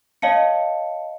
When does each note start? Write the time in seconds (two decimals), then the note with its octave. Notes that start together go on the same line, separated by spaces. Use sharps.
0.22 C#5 D#5 F5 A5 C#7